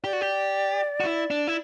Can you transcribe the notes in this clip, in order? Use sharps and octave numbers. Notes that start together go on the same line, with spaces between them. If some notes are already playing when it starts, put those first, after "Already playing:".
G4 D5
F#4
G4
F#4
E4
D4
E4